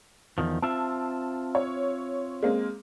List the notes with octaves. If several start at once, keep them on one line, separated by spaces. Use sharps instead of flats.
E2 D#3 F3
C4 F4 E5 A5
C#5
G#3 A#3 C4